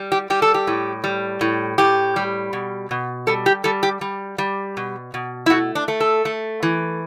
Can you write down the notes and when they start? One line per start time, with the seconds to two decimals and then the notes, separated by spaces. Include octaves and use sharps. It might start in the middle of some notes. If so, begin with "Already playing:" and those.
Already playing: G3
0.12 G4
0.30 G3 G4
0.42 A4
0.54 G4
0.67 A2
1.04 G3
1.41 A2
1.78 A2 G4
2.16 G3
2.53 B2
2.91 B2
3.27 G3 A4
3.46 G4
3.64 G3 A4
3.83 G4
4.01 G3
4.38 G3
4.77 B2
5.14 B2
5.46 E4
5.50 A3 F#4
5.75 D4
5.88 A3
6.00 A4
6.25 A3
6.63 E3